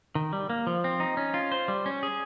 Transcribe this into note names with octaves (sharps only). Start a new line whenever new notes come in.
D#3
G3
A#3
F3
C4
D#4
C#4
F4
C5
G3
C#4
G#4